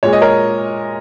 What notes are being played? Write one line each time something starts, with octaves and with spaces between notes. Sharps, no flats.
A#2 G#3 C#5
D#5
A#4 C#5